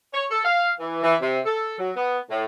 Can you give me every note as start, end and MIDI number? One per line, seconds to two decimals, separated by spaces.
0.13 0.24 73
0.30 0.42 69
0.44 0.70 77
0.79 1.01 52
1.03 1.14 52
1.21 1.38 48
1.45 1.77 69
1.78 1.89 54
1.95 2.17 59
2.29 2.44 45